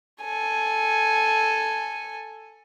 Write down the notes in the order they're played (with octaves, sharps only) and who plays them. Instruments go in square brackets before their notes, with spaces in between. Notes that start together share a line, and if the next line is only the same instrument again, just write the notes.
[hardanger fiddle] A4 G#5